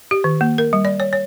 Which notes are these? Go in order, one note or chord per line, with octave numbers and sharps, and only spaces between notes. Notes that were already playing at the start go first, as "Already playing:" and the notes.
G4
D#3
A#3
A#4
G3
D5
C#5
C#5